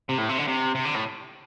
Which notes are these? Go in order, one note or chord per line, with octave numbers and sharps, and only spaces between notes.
C3
A2
C3
D3
C3
C3
D3
A2